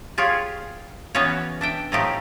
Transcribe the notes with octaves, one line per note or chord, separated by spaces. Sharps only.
F4 G4 G#4 C#5
E3 B3 C#4 F#4 B4 C#5
D4 E5 G5
A2 F3 A3 D#4 G4